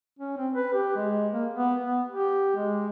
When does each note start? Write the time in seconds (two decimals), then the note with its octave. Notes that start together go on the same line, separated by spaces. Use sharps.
0.19 C#4
0.37 C4
0.53 B4
0.73 G4
0.96 G#3
1.33 A#3
1.54 B3
1.83 B3
2.09 G4
2.56 G#3